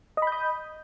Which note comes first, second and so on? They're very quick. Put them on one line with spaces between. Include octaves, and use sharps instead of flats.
D#5 B5 G6 D#6